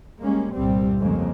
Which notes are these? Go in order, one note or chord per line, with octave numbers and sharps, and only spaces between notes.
G3 G#3 A#3 C#4
C2 G2 A#2 G3 C4
F2 C#3 G#3 A#3